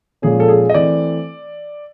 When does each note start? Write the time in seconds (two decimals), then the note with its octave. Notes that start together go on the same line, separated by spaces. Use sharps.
0.22 A#2 F3 G#3 C#4 G#4
0.40 A4
0.48 G#4
0.70 D#5
0.74 E3 A3 C4 D5